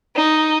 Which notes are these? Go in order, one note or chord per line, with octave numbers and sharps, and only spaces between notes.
D#4